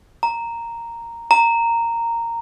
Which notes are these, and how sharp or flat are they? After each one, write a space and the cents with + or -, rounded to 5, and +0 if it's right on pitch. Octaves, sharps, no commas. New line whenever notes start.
A#5 -5
A#5 -10